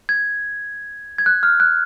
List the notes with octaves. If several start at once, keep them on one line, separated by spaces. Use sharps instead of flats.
G#6
G#6
F#6
F6
F#6